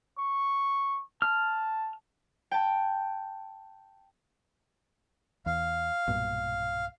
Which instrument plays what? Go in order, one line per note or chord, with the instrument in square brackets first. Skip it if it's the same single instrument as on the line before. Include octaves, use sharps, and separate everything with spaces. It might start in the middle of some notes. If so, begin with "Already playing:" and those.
[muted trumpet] C#6
[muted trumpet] A5 [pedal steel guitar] F6
[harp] G5 A5
[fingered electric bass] E2 [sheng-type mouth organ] F5
[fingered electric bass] B1 G2 A#2